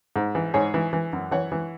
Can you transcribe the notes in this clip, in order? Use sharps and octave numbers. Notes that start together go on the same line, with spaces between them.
G#2
E3
G#2 G#4 C#5
E3
E3
F#2
E3 C#5 F#5
E3